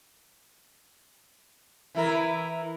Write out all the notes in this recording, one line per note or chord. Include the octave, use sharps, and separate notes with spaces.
E3 E4 A#4